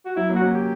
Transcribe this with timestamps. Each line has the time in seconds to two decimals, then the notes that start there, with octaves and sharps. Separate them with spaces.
0.05 F#4
0.16 F#3 E4
0.29 F#3 A#3
0.36 F#4
0.42 A#3 C#4
0.54 G4